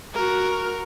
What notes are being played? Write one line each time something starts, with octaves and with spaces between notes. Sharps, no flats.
F#4 A#4